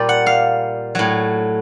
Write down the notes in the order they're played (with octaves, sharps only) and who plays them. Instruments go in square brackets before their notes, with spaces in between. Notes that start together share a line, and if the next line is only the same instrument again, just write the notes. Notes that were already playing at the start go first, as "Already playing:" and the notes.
Already playing: [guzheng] A#2 G3 D5
F#5
F5
A2 F#3